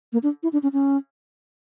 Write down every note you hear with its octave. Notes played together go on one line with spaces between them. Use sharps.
A#3
D4
E4
D4
C#4
C#4